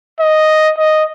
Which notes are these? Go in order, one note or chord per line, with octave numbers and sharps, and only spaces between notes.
D#5
D#5